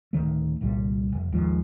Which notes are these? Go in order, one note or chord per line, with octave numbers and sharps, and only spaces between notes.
D1 G#1 D#3 A3
G1 C2 A#2 G3
F1
G#1 D#2 G#2 F3